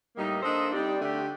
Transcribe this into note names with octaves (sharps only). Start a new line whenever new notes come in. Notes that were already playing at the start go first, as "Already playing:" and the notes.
A2 G3 A#3 D#4
A#3 D4 A4 C5 D#5
G3 C4 D#4 G4 D5
D3 A3 D4 G4